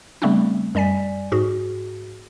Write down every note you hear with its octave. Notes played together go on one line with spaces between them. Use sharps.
C#3 G3 A3 B3 C4 D4
F#2 G3 D5 G#5 B6
G#2 F#4 G#4